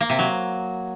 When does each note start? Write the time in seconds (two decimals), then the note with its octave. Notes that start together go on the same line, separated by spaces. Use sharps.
0.01 A#3
0.10 C3
0.19 F#3